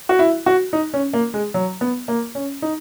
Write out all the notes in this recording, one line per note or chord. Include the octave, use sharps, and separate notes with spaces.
F#4
E4
F#4
D#4
C#4
A#3
G#3
F#3
B3
A#3
C#4
D#4